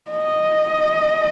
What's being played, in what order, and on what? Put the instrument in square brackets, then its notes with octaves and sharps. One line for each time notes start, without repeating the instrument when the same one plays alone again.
[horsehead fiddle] D#5